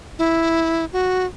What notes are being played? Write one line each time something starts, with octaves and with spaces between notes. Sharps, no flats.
E4
F#4